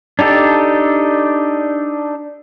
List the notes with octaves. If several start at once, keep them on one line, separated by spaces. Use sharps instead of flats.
D4 D#4 G4 A4